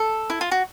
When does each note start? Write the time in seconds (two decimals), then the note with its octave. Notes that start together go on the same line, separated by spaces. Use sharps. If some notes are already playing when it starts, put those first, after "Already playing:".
Already playing: A4
0.30 E4
0.41 F4
0.51 F#4